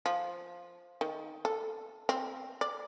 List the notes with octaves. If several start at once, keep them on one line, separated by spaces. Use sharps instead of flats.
F3
D#3
A4
C4
D5